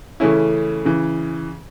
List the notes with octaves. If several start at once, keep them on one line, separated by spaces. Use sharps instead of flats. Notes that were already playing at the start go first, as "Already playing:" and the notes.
C#3 E3 A3 C#4 E4
C#3 E3